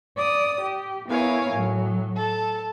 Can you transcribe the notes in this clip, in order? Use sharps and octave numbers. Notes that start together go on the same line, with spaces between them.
D5 D#6
G4
B3 E4 A#4 C#5 F5 G#5
A2 F#3
A4 A5